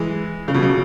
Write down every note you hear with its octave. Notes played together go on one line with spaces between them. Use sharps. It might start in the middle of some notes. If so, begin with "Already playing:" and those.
Already playing: E3 G#3
C#3
B2
C#3